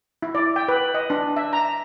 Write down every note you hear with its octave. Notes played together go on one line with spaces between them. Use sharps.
E4
D5
G5
B4
D#5
D4
E5
A#5